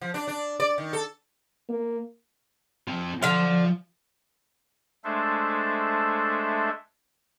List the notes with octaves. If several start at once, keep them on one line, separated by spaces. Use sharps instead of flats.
F3
D4
D4
D5
D#3
A4
A#3
C4 F4
D3 F3 F5 C6
G#3 A3 D4 A4 C5 E5